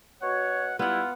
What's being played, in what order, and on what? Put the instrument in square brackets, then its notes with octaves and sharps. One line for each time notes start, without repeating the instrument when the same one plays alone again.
[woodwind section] B2 F#4 C#5 [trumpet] F#5
[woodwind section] G3 E4 [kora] B3 F#5 [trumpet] F4